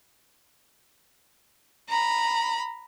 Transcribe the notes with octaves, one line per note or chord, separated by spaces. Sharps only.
A#5 B5